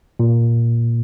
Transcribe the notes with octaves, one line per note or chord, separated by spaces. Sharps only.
A#2